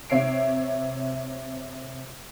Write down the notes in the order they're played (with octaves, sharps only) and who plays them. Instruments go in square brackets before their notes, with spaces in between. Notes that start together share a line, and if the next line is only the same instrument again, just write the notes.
[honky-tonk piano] C3 C#5 E5 C7 D7